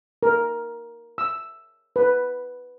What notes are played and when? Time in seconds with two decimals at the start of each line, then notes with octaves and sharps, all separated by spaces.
0.23 A#4
1.18 E6
1.96 B4